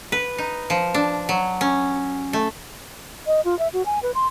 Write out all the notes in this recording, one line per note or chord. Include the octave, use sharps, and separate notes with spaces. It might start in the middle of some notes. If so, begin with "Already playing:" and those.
B4
D#4
F3
D4
F#3
C#4
A3
D#5
F4
E5
F#4
G#5
B4
C6